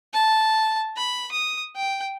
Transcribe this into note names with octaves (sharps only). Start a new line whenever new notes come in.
A5
B5
D#6
G5